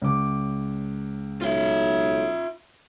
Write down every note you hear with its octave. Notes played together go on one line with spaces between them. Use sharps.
C#2 D6
B1 F4 E5